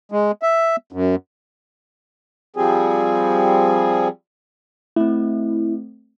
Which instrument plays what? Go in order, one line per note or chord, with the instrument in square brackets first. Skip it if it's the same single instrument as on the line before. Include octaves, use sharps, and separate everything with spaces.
[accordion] G#3
E5
F#2
[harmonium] F3 G3 C4 G#4
[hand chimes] A3 C4 [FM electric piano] E4